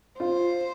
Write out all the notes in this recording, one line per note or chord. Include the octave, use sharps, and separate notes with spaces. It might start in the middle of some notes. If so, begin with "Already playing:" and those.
F4 C5